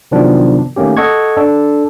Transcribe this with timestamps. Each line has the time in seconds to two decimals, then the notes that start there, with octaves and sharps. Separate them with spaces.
0.11 C3 D#3 F3 F#3 B3 D4
0.76 D#3 A3 A#3 C#4 G4
0.97 A4 D#5 F#5 C#6 G#6
1.37 D4 A4